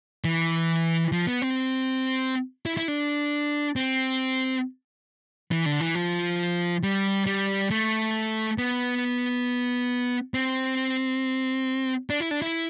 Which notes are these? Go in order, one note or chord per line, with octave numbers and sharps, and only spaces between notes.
E3
F3
B3
C4
E4
E4
D4
C4
E3
D3
E3
F3
G3
G3
A3
B3
C4
D4
E4
D4
E4